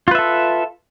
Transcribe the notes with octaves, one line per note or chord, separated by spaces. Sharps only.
F4 A4 B4 E5